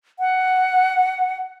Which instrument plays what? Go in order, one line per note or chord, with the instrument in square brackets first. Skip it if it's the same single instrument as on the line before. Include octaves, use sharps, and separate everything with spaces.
[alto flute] F#5